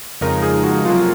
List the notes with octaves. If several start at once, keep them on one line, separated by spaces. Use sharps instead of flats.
F2 C#3 F3 G#3 D#4 A#4
G#4
F#4
F2 C3 F#3 A#3 F4